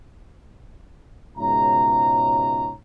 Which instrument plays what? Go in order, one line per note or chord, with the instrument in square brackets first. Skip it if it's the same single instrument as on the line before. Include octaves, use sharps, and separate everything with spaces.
[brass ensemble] C#2 G#2 B2 C#5 E5 A#5